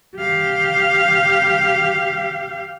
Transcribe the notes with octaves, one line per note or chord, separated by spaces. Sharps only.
G4 F5